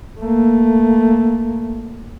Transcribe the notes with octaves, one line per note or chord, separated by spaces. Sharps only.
A3 A#3